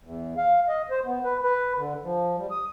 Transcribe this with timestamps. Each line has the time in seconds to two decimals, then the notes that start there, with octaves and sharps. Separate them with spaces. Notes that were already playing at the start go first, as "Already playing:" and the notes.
0.04 E2
0.37 F5
0.68 D#5
0.90 C5
1.05 B3
1.24 B4
1.44 B4
1.78 D3
2.04 F3
2.37 G3
2.51 D#6